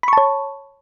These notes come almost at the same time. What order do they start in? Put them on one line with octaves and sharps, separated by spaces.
B5 C#6 A5 C#5